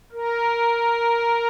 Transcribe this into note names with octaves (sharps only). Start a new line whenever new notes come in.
A#4